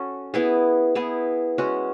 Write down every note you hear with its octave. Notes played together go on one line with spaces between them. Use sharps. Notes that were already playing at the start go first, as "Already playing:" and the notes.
Already playing: C#4 F#4 A4
B3 E4 G#4
B3 E4 G#4
G#3 C#4 F#4